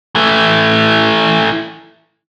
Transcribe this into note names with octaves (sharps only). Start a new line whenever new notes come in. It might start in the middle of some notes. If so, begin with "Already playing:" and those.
E3 A3